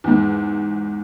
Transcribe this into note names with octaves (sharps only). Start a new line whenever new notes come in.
E2 G#2